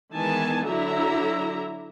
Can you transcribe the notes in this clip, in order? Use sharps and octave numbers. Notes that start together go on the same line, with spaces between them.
D#3 E3 G#3 B3 G#5 A5
D3 F#3 D4 E4 E5 A#5